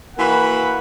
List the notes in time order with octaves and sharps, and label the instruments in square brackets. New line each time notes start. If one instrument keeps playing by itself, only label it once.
[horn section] E3 A#3 F#4 F#5 B5